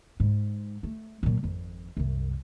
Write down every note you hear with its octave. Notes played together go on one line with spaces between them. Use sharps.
G#2
A3
A#2 F#3
G#1 F2
C2 F#2